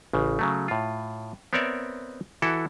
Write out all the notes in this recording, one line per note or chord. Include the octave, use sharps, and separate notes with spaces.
A1 C#3
C#3 F#3 A3
A2 F4
B3 C4 A#4 C#5 D5 E5
E3 E4 F#4 A4